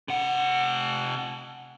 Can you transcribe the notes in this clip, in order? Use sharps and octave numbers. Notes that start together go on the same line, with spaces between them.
C3 F#5